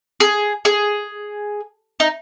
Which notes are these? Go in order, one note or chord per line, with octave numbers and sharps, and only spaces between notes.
G#4
G#4
D#4